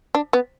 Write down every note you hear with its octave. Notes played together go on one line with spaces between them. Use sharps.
D4
B3